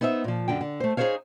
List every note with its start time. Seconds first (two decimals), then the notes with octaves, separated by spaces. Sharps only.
0.01 B3 D#4 C5 D#5 E5
0.24 A#2 F3
0.48 F#2 D3 G5
0.61 D3
0.80 A3 C5
0.97 D#4 G#4 A4 C5 C#5 F5